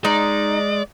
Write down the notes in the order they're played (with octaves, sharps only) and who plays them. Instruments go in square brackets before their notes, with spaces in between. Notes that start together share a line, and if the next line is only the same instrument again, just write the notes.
[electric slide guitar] G#3 [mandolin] D#4 [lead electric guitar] D5